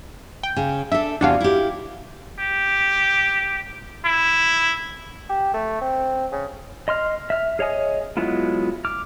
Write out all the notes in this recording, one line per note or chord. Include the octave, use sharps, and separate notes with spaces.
G5
C#3
D4 A4 E5
E2 C3 D4 F#4 F5
E4 G4
G4
E4
G4
A3
C4
C#3
D#5 C6 F6
E5 F6
G#4 C#5 D#5 G#5 D#6
F#3 G#3 B3 E4 F4
D6 F6